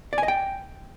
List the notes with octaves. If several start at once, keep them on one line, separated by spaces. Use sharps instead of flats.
D5
G#5
D#5
G5